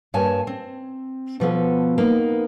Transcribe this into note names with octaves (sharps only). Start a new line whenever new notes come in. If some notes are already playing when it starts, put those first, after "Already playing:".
G2 A#3 C#5 G#5 A5
C4
B2 F3 B3 A4
A#3 B3 D#4